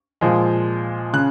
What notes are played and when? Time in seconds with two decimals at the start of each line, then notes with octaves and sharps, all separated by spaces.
0.21 A#2 F3 G#3
1.13 C#3 F#6